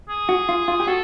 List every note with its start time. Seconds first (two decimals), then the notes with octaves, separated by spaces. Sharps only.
0.09 G#4
0.29 F#4
0.49 F4
0.68 F4
0.80 G4
0.88 F#4 A4